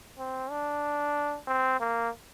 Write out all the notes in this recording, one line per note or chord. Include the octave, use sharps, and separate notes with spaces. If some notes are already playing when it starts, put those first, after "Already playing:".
C4
D4
C4
A#3